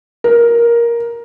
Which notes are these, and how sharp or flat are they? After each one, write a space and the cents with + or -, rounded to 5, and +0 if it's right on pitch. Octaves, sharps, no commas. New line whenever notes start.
A#4 +10